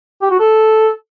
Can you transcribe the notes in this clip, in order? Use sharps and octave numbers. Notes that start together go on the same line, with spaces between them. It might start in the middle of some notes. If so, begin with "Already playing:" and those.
G4
F#4
A4